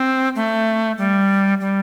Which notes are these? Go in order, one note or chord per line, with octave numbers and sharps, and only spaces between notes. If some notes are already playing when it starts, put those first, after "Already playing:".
Already playing: C4
A3
G3
G3